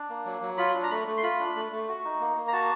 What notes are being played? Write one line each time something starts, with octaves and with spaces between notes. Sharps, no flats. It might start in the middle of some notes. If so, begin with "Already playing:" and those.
Already playing: D4
A#3
F#3
F#3
F4 B5
D4
A#5
A3 B5
A3
C6
F4 B5
D4
A3
A3
F#4
D#4
A#3
A#3
A#5
F#4 A5